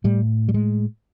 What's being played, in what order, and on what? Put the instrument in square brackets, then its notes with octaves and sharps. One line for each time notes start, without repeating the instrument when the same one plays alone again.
[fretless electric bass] A2 G3
G3
G#3